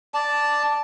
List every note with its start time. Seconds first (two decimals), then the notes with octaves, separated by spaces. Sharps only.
0.14 D5 A5